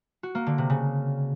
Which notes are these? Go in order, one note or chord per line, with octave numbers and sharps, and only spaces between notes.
F#4
A#3
D3
C3
C#3